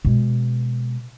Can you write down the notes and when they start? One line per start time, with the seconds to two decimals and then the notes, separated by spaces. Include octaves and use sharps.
0.05 B2 G#3